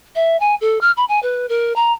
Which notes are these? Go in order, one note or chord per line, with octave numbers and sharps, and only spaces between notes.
E5
G#5
A4
F6
B5
G#5
B4
A#4
A#5